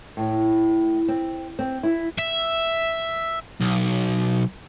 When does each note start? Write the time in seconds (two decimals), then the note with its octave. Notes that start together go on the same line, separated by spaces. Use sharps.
0.17 A2
1.08 C4
1.59 C4
1.83 E4
2.18 E5
3.61 B1